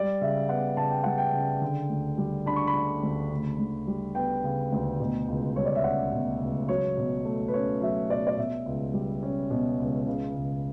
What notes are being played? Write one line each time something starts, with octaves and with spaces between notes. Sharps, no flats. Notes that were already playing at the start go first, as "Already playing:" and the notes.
Already playing: G3 D5
C#3 E5
B3 F#5
C#3 A5
G5
G3 F#5
G5
C#3
D3
D2
G3
D4 B5
C#6
B5
D3
D2
C#3
D2
G3
B3 G5
C#3
D2
B2
C#2
G3 C#5
D5
E5
C#4 F#5
B2
C#2
F#3 C#5
B2
A3
B4
C#4 C#5
F#3 E5
B2 D5
D5
B2 E5
C#2
G3
C#4
B2
C#2
C#3
C#2